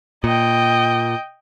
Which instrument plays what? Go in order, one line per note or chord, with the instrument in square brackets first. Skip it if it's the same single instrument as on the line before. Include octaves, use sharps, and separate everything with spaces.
[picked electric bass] A#2 [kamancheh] D#5 G5